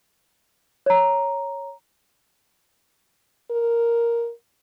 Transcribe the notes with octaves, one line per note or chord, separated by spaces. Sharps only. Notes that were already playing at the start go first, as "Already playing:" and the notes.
C#5 A#5
A#4